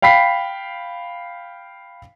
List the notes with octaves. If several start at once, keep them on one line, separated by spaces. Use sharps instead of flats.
F5 G5 B5 B6 C7